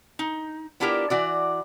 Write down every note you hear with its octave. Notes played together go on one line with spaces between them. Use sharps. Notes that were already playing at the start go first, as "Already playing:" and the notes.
D#4
B3 D4 E4 F4 G4 A#4
E3 F#4 D5